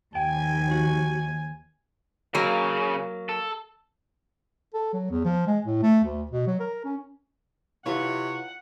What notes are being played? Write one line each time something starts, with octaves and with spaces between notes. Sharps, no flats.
D#2 F3 G5 G#5
F#4
C#3 F#3 A#3
A4
A4
F#3
E2
F3
G#3
A2
A3
D2
B2
F#3
A#4
C#4
C3 E4 F4 B4 C#5 F#5